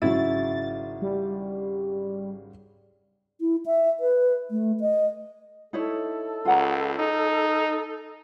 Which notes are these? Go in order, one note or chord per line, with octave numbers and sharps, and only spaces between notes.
G#1 C#3 F#3 E4 A6
G3
E4
E5
B4
A3
D#5
D#4 E4 A4 C#5
C#2 F4 F#5 A#5
D#4